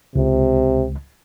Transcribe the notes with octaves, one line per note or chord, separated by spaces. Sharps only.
C#2 C3